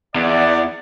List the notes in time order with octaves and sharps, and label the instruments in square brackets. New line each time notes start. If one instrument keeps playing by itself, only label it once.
[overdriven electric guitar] E2 [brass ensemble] D5 F#5